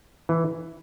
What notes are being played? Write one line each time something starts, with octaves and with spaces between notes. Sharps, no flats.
E3